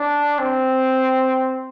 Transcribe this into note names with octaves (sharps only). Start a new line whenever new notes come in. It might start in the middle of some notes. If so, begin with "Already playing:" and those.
Already playing: D4
C4